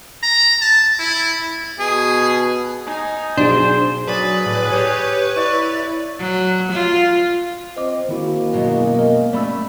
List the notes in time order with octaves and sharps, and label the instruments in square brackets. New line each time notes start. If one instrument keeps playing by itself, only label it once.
[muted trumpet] A#5
A5
E4
[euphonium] B2 [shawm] G#4
[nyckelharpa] D#4 G#5
[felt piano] B1 G#4 [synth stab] D4 [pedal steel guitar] C5
[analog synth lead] F#3 [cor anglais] G#4 [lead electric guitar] B4 [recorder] D5
[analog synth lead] A2 [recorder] D5
[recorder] G4 [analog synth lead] C#5
[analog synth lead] E4 [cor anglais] C#5 [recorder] D5
[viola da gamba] F#3
F4
[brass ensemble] C4 [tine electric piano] C5 D#5 D6
[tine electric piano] D#3 E4 F#4 [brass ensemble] G#3 A#3
[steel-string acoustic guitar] F#2 B2 F#3
[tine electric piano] A#4 D#5
[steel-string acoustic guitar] A3 C#4 E5 [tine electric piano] D5 B5 E6